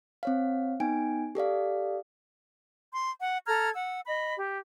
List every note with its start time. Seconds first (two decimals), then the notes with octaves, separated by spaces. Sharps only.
0.23 C4 C#5 F5
0.80 B3 D#4 G5 G#5 D7
1.35 G4 A4 D5 F5
2.94 C6
3.21 F#5
3.46 A4 A#5 F6 G#6
3.75 F#5 E6
4.06 D#5 B5
4.36 G4